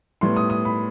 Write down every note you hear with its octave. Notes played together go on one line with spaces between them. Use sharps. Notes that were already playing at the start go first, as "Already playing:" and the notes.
A2 G3 B3 C6
D#6
D#6
B5